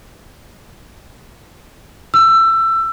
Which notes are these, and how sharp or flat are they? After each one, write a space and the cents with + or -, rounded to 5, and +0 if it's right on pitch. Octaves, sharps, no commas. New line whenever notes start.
E6 +20